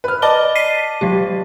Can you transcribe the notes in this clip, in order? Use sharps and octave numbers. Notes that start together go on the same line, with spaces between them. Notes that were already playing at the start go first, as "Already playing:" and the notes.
B4 F6
D5 D#5 A5 G7
B6 C7 D#7
F#3 G#3 G4